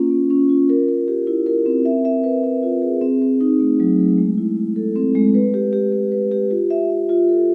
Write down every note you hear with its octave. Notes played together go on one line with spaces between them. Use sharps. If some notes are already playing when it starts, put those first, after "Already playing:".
Already playing: A#3 C#4 F4
A#3
C#4
F4
A#4
A#4
G4
E4
A#4
C4
E5
E5
B4
E5
F4
G#4
C4
C4
D#4
A3
F#3
A3
G#3
E4
G#3
A4
C4
G#3
B4
G4
G4
G4
B4
G4
F4
E5
E5
F4
A4